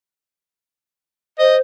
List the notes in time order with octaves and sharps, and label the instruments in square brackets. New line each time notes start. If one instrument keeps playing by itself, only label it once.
[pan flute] C5 [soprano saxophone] D#5